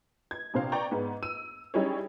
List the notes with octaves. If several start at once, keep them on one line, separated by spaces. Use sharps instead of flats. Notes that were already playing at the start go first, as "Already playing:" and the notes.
G#6
A#1 C3 C5 F5
D5 G5 A#5 C#6
G#2 B3
E6 D#7
G3 C#4 D#4 E4 G#4 C#5